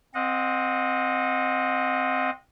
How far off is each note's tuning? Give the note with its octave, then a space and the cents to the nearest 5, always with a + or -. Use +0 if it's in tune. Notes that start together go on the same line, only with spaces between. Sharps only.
C4 +0 D#5 +0 F#5 -35